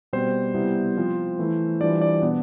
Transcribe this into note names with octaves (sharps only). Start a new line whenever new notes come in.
B2 G3 C4 C5
C3 G3 B3 E4
F3 C4 F4
E3 A3 E4
E3 G3 D4 F4 D5
D5
B2 B3 D4